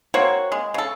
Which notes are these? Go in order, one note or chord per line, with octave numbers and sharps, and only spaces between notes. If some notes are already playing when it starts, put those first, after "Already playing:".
A#3 C4 F#4 C#5
G#3
C#3 A4